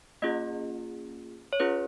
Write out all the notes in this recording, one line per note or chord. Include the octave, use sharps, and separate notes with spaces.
A#3 C#4 F4 G#4 D#5
C#5
C#4 F4 G#4 B4